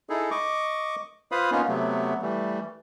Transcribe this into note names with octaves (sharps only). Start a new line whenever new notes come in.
D#4 E4 G#4 A4
D#5 C#6 D6
F4 B4 C5 F5 B5 D#6
A#3 B3 C#4 D#4 F4
C3 F#3 A3 B3
E3 G3 A3